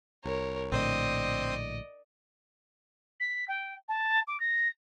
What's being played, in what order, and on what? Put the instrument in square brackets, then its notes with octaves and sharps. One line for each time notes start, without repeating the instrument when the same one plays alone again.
[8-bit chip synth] C2 [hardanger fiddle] A#4 C#5
[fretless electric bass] A#1 A2 D3 [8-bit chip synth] C4 C5 D#6 [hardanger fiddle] D5 D#5
[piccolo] B6
G5
A5
D6
A#6